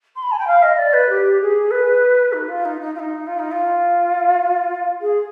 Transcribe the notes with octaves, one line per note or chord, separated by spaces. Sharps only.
C6
B5
G#5
G5
F5
D#5
D5
B4
G4
G#4
B4
D#4
F4
D#4
D#4
F4
D#4
F4
D#4
F4
G#4